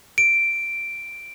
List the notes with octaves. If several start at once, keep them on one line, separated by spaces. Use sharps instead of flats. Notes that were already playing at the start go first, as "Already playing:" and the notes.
D7